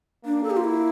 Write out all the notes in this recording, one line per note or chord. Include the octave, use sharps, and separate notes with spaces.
A#3 D4
A4
G4
F4
E4